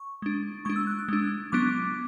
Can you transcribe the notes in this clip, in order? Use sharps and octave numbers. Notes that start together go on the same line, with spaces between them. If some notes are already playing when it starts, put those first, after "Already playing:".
Already playing: C#6
G#3 D4
G#3 D4 C#6
E6
F#6
E6
G#3 D4
F#3 B3 D4 D6